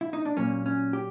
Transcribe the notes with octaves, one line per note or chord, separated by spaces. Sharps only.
E4
D#4
D4
A#2 F#3 A#3 C#4
C#4
G4